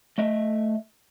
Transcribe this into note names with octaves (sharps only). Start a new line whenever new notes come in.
A3 D#5 E5